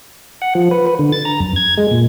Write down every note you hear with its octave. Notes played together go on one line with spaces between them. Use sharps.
F#5
F3
B4
B4
D3
A6
A#5
F#2
G#6
G#3
A#2